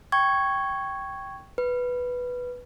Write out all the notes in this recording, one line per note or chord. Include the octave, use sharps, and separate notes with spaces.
G5 C#6 G#6
B4